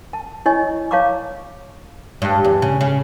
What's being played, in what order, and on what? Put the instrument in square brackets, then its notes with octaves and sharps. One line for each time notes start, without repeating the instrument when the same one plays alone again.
[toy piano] A5
E4 C#5 D#5 G#5 C#6
C#5 F5 A5 A#5 C#6 D6
[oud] G2
E2
C#3
C#3